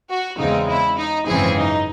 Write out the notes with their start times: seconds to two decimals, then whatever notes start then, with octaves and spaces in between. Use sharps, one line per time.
0.10 F#4
0.39 E2 C#3 G#3 C4 D#4
0.69 E4
0.98 D#4
1.27 G#1 F#2 C#3 E3 C4 G#4
1.57 D#4